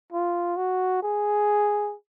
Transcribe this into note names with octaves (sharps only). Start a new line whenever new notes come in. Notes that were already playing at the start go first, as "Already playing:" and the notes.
F4
F#4
G#4